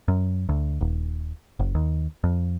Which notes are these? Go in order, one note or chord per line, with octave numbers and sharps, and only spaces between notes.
F#2
D2
D#1
F#1
D#2
F2